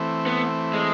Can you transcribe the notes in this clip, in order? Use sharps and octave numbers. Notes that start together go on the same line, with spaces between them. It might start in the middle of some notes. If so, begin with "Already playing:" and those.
Already playing: E3 A3 C4
B3
G#3